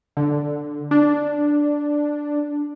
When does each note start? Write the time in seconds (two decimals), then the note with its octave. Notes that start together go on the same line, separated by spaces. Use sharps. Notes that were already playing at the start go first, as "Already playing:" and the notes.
0.17 D3
0.91 D4